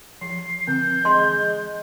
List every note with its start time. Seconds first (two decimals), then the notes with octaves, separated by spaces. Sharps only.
0.21 F3 C7
0.67 D3 C4 G6
1.05 G#3 D#5 C6